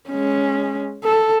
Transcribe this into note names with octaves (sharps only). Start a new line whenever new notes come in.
G#3 C#4
A4